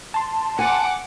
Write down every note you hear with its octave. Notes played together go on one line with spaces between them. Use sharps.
A5 C6
F#5 G#5 D6